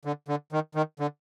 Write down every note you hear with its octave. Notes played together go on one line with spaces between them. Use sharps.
D3
D3
D#3
D#3
D3